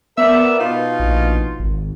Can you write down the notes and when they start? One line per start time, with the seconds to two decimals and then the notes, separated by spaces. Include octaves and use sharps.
0.18 B3 A#4 D5 E5
0.60 B2 D#4 F4
1.00 A#1
1.60 G#1